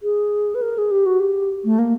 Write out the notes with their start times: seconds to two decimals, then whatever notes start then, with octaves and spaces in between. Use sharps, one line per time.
0.03 G#4
0.55 B4
0.62 A#4
0.78 G#4
0.91 G4
1.06 F#4
1.20 G4
1.64 A3
1.79 A#3